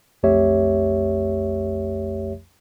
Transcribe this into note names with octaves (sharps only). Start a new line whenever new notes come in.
B1 F2 A3 G4 C#5 E5